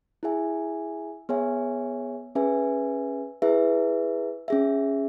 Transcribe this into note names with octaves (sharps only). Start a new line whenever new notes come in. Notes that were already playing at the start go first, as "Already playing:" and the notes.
E4 G#4 E5 G#5
B3 G#4 C#5 E5 G#5
C#4 G#4 B4 E5 G#5
E4 G#4 B4 E5
C#4 G#4 E5